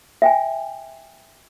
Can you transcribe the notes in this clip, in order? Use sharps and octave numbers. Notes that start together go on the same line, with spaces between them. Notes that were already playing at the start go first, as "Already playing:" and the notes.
E5 G5 G#5